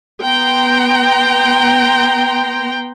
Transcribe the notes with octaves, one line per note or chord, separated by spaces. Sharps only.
B3 G5 A#5 C6